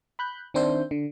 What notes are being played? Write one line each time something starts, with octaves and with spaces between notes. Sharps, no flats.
B5 F#6 G6
D#3 C4 D4 C5 E5 G6
D3